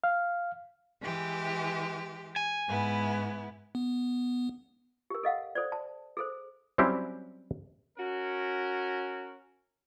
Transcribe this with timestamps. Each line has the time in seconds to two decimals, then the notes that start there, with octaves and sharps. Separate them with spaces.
0.04 F5
1.00 E3 G#3 G4
2.36 G#5
2.68 G#2 B3 E4
3.75 B3
5.10 G4 A#4
5.23 A4 D#5 F5 F#5
5.55 A4 C5 D5
5.72 A5
6.17 G#4 A4 C5
6.78 F#3 G3 C4 C#4 E4 G4
7.97 C#4 F#4 A#4